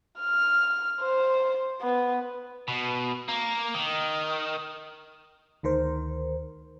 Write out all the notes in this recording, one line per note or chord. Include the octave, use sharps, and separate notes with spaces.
F6
C5
B3
B2
A#3
D#3
D2 D#3 A#4 C5